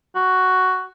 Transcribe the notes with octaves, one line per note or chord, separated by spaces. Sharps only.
F#4